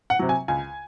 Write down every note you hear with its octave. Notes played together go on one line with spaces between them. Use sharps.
F#5
C3 F#3
G#5
C#2 G#5